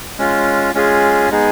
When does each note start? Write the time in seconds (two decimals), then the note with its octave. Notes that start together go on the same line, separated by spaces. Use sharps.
0.18 G#3 C#4 F4
0.74 G#3 C#4 F4 G#4
1.30 G#3 B3 D#4 G#4